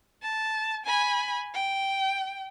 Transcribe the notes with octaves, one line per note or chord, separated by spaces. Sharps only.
A5
G#5 B5
G5